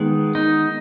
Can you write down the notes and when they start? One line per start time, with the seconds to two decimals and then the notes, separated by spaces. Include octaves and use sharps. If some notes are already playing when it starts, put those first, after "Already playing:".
Already playing: D#3 G#3 B3
0.35 D#4